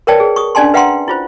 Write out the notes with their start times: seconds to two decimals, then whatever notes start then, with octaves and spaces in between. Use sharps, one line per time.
0.07 A#4 B4 C#5 D5 G5 A5
0.20 G#4
0.36 C#6 D#6
0.55 C#4 D4 D5 G#5 A5 C6
0.74 B4 E5 F#5 G5 A#5 C6
1.08 E4 F4 C5